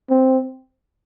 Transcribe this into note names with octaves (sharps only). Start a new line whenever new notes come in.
C4